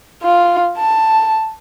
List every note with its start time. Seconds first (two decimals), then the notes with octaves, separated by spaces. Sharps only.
0.23 F4
0.77 A5